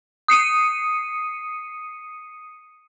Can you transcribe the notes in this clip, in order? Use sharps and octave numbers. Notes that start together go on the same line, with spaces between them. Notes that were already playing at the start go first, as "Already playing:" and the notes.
D#6 C7 C#7 D#7